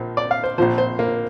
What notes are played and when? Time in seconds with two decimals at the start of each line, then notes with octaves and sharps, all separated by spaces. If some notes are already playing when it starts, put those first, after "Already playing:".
Already playing: A#1 A#2 F3
0.17 D5
0.31 F5
0.44 C5
0.58 A#1 A#2 F3 C5
0.78 C5
0.99 A#3